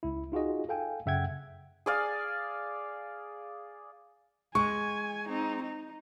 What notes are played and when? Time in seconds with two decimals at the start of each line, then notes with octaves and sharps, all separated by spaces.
0.03 C#2 E4
0.32 D#4 F4 F#4 G#4 D#5
0.69 A4 F5 G5 G#5
1.06 F#2 C#3 E5 F#5 G5 G#6
1.86 G#4 D5 F5
4.55 G#3 G#5 C#6
5.27 C4 D#4
5.62 D#4